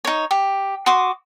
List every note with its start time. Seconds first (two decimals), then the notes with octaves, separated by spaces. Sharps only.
0.05 D#4 C#5
0.31 G4
0.86 F#4 C6 D6 D#6